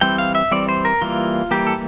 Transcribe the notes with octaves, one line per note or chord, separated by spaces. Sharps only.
E3 G3 C4 G5
F5
E5
E3 G3 C4 D5
C5
A#4
E3 G3 A#3 F4
E3 G3 A#3 G4
A4